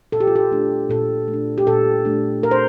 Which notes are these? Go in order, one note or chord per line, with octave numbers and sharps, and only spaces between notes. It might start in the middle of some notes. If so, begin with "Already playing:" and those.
A#2 A4
G4
F4
G4
A3 D4
A#2 A4
A3
D4
G4
A#2 A4
A3 D4
A#2 A#4
C5